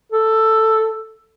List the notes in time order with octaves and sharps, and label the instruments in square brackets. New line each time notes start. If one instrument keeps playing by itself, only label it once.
[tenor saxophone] A4